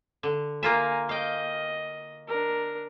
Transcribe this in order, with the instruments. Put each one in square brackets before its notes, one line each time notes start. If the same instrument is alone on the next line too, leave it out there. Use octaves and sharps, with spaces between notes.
[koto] D3
[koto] A#3 F4 E5 [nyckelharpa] G#5 A#5
[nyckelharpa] D#5 [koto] F5 G5
[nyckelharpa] D4 A#4